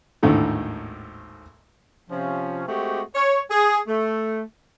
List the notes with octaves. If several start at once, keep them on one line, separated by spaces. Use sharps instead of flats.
G#1 D#2 A2 D3 D#3
C3 F3 C#4
G#3 A3 C4 F#4 G4
C#5
G#4
A3